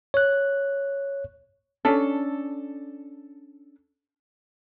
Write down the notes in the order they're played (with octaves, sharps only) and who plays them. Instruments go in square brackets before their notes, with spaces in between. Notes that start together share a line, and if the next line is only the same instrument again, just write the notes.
[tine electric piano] C#5 F#6
[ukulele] C#4 D4 [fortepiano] A4